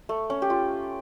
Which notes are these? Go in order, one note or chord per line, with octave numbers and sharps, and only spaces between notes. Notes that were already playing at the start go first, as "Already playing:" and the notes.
A3
C#4
G4
F4